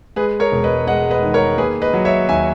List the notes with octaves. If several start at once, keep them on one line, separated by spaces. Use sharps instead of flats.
G#3 G#4 B4
A#4 C#5
E1
B4 D#5
G#3 D#5 F#5
B4 D#5
D#3
A#4 C#5
A#3 G#4 B4
B4 D#5
F#3
C#5 E5
D#2 E5 G#5